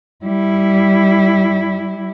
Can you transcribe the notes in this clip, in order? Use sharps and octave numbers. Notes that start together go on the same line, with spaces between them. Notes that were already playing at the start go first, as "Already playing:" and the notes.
G3 E4